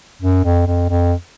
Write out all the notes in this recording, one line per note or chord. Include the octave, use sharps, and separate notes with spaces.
F#2
F2
F2
F2